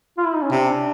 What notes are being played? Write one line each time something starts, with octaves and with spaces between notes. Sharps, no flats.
F4
E4
D#4
C#4
C3 D4